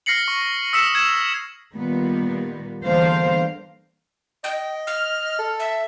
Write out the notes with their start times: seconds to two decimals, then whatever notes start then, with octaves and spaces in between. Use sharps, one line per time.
0.06 F6 A#6 C7 C#7 F#7
0.28 C#6
0.73 D#6 E6 B6 C#7 E7
0.95 G#6 E7
1.74 A#2 D#3 G3 B3
2.85 E2 D3 G3 A#3 C5 F5
4.44 D#5 G5
4.87 F6
5.39 A4
5.60 E5